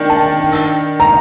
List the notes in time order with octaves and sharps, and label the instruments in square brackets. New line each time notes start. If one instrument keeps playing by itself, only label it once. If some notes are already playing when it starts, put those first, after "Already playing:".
Already playing: [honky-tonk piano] D#3 D4 [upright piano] A#4 G5
[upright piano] A5
A#5